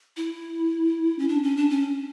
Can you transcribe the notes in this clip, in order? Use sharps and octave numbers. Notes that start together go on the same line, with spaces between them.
E4
C#4
D4
C#4
D4
C#4